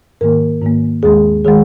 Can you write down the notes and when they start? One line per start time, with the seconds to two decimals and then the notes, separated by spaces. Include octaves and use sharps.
0.21 G#2 D#3 A#3 A#4
0.61 G#2 D#3 A#3
1.03 D#2 D#3 G#3 G#4
1.45 D#3 G#3 G#4